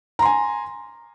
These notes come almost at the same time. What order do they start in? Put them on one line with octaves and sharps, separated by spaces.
A#5 C6 G#5